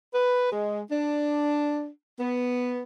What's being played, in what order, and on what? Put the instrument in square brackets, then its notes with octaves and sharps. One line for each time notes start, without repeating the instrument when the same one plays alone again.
[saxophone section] B4
G#3
D4
B3